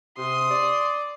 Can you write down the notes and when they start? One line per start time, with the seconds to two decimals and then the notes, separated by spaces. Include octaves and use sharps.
0.17 C3 C6 D#6
0.51 D5